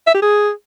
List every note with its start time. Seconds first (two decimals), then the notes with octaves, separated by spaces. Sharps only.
0.07 E5
0.14 G4
0.22 G#4